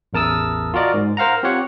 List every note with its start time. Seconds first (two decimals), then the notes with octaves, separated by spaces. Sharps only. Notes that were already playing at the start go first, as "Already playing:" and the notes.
0.13 A1 E2 A#4 A5 D#6 E6
0.74 F4 F#4 A#4 D5 D#5
0.94 G#2
1.17 A#4 C5 F5 F#5 A#5
1.43 C4 F4 G4 C#5 F#5